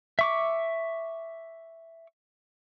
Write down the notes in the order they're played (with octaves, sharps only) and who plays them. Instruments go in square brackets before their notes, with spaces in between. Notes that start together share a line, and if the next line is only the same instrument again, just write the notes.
[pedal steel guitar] E5 C#6 D6